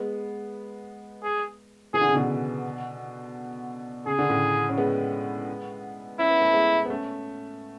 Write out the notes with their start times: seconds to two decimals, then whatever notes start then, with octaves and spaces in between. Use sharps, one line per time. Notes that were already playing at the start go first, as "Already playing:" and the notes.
Already playing: G#3 B3
1.23 G#4
1.94 E3 G#4
2.01 D3
2.08 C#3
2.15 B2 D3
4.06 C#3 G#4
4.19 D3
4.30 A2 C#3
4.69 C#4
4.77 G#3 B3
6.19 C#4 E4
6.30 B3
6.41 A3
6.53 G#3 B3
6.85 B3
6.90 A3 C#4